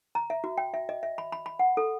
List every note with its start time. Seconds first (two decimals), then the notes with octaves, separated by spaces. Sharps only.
0.15 A#5
0.30 E5
0.44 F#4
0.58 G5
0.74 E5
0.89 D#5
1.03 E5
1.18 B5
1.32 B5
1.46 B5
1.59 F#5
1.77 A4